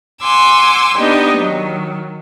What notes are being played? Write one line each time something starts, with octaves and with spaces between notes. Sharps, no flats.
F#5 G#5 C6 D6 E6
B3 D4 D#4 G4 D#5
D#3 F#3